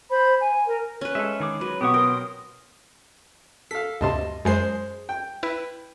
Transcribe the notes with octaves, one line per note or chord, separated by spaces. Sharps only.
C5 B5
G#5
A#4
C#4 B4
G#3 A4 E5
D#3 G#4 D6
F#3 B4
B2 B3 G4 F#5 C#6 D#6
A#4 G5 C6
A4 F5 B6
D2 G2 C3 D#5 A5 C6
F#2 G#3 G#4 C5 C7
G5
E4 B4